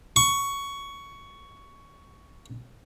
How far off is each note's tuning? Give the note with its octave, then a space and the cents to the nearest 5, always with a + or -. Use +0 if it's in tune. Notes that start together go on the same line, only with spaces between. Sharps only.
C#6 +10